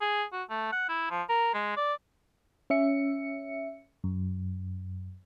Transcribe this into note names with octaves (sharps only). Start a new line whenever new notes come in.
G#4
F#4
A3
F#5
E4
F3
A#4
G#3
D5
C#4 E5 C#7
F#2